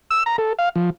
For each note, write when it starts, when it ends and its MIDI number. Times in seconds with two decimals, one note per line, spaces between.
0.11 0.23 88
0.26 0.36 82
0.38 0.53 69
0.59 0.69 77
0.76 0.90 53